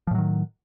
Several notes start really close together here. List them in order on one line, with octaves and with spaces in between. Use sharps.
F3 A2 F#3 D#3